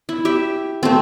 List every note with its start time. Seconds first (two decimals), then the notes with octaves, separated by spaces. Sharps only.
0.09 E4
0.25 G4 E5
0.83 A3 C4